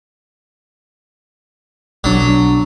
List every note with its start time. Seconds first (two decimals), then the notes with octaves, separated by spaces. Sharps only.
2.04 B1 F#3 D4